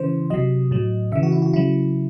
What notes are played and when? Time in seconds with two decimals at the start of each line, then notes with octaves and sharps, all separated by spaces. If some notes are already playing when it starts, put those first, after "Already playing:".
Already playing: C#3 E3 C5
0.30 C3 F#3 D#5
0.71 A2 F#3
1.12 C#3 E5
1.15 E3
1.23 F#4
1.32 E4
1.42 F#4
1.53 C#3 F#3 E4